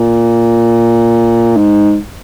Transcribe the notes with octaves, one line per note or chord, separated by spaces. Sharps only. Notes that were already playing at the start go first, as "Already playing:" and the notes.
Already playing: A#2
G#2